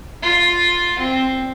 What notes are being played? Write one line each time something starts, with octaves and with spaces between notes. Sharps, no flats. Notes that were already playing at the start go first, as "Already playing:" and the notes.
F4
C4